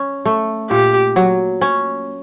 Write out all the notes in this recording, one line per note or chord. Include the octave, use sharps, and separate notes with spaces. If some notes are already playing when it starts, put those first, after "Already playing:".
Already playing: C#4
A3
A#2 G4
F#3
C#4